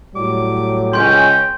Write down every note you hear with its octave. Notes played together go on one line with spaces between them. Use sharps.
A2 F#3 G3 D6
C#2 C#4 G5 C6 G6